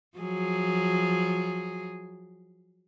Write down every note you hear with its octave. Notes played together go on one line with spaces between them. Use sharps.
F3 F#3 G#4